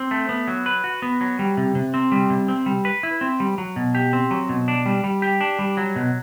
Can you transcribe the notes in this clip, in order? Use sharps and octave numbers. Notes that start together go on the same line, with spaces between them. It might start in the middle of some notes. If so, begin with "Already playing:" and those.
Already playing: C4
A3
B3
F#3
B4
F#4
B3
F#3
G3
C3
C3
C4
G3
C3
C4
G3
B4
E4
C4
G3
F#3
B2
G4
C4
F#3
B2
D4
G3
G3
G4
D4
G3
F#3
B2